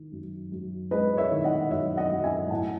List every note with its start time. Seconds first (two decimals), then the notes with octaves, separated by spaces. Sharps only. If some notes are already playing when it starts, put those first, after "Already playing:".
Already playing: D#3
0.12 F#2
0.52 F#2
0.91 G#3 B4 D#5
1.17 C#5 E5
1.31 D#3
1.44 D#5 F#5
1.71 F#2 C#5 E5
1.97 D#5 F#5
2.10 F#2
2.24 E5 G#5
2.50 A2 F#5 A5